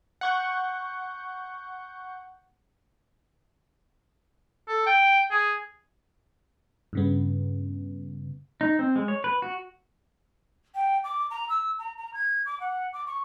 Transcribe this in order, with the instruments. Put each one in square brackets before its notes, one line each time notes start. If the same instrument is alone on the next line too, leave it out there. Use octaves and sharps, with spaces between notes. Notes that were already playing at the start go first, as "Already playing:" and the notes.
[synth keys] F#5 C#6 G6
[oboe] A4
G5
G#4
[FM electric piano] G2 C#3 B3
[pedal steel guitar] D#4
C4
G#3
C#5
B4
F#4
[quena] G5
D6
A#5
E6
A#5
A#5
G#6
D6
F#5
D6
C#6